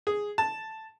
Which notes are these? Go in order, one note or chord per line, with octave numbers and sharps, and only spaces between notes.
G#4
A5